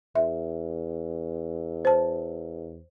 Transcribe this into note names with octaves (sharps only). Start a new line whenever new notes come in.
E2 E5
C5 A5